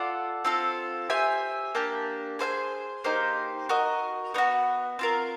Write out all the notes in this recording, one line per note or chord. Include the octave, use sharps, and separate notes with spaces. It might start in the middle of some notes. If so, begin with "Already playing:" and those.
Already playing: F4 A4 D5 F#5
C4 F4 A4
G4 C5 E5 G#5
A#3 D4 G4
G#4 C5 F5 G#5
A#3 D#4 G4 C5
F#4 A#4 D#5
B3 D#4 F#4
C4 F4 A#4